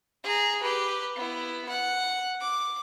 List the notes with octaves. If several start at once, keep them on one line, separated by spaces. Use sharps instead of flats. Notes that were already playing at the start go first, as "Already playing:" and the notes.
G#4 A#5
G4 B4
B3 E4
F#5
D6